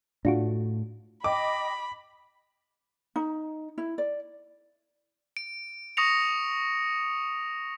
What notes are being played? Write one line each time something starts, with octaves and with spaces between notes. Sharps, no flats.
A2 A3 D4 F4 F#4
D#5 G5 B5 D6
D#4
E4
D5
D7
C#6 D#6 A#6 C#7 F7